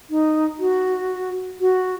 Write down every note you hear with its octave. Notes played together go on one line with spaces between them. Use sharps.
D#4
F#4
F#4